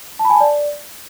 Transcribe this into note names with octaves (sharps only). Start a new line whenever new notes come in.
A5
B5
G#5
A5
D5